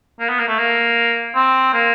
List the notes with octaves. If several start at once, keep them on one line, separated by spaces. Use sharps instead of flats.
A#3
B3
A#3
A3
A#3
C4
A#3